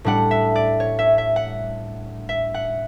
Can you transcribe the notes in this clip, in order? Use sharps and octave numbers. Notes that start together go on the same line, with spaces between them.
A2 G3 D4 F#5
E5
D5
C#5
E5
E5
F#5
E5
F#5